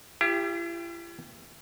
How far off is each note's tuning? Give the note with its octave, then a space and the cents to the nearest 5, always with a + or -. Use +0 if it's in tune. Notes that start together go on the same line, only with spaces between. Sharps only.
E4 +45 G4 +15